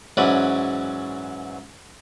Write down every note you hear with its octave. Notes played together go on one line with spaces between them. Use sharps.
G#2 E3 F#3 C#4 B4 D5